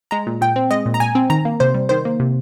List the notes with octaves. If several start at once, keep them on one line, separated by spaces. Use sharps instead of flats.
G#3 A#5
A#2
A#2 G5
C4
G#3 D#5
A#2
A#5
A#2 G#5
C4
D#3 A#5
A#3
C3 C5
G3
D#3 C5
A#3
C3